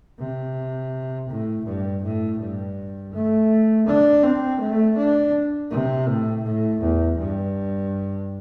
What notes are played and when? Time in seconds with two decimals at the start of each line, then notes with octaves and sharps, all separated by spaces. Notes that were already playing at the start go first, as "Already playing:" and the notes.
0.19 C3
1.29 A2
1.66 G2
2.03 A2
2.39 G2
3.14 A3
3.87 D4
4.23 C4
4.60 A3
4.97 D4
5.71 C3
6.07 A2
6.44 A2
6.81 E2
7.18 G2